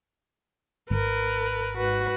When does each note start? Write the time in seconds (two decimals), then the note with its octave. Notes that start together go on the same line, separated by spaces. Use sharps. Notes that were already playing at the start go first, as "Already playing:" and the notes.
0.90 G#1 A#4 B4
1.77 G#2 F#4 B4